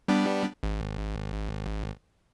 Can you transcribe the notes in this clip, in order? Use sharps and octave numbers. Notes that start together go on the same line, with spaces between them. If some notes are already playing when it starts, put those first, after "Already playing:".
G3 B3 D4
G#1